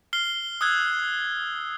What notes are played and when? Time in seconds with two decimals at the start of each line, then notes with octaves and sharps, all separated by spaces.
0.13 F6 C7 G7
0.61 D#6 E6 F#6 G#6